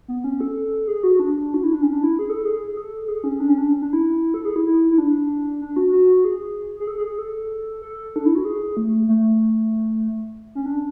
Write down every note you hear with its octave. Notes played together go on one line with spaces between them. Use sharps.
B3
C#4
A4
G#4
F#4
D4
F#4
E4
D4
C#4
D4
E4
G#4
A4
G#4
A4
G#4
C#4
D4
C#4
D4
C#4
D4
E4
A4
G#4
E4
E4
E4
D4
D4
F#4
F#4
G#4
G#4
A4
G#4
G#4
A4
A4
D4
E4
F#4
G#4
A3
A3
C#4
D4